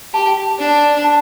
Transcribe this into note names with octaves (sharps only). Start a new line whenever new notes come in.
G4 A5
D4
A5